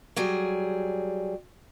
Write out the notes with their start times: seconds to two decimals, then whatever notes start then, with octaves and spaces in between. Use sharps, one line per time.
0.16 F#3 G3 G#4